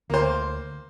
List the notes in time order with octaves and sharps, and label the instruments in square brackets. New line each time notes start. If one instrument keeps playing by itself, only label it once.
[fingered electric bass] D2 [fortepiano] A#3 C5